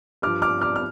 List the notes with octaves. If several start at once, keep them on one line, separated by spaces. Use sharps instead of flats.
G2 F3 D6 F6
D6 F6
D6 F6
F6